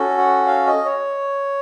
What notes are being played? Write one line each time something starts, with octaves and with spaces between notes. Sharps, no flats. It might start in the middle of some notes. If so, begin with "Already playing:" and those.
Already playing: C#4 F#4 A4
F#5
F5
D#5
C#5